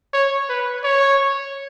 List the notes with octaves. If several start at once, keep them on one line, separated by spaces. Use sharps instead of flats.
C#5
B4
C#5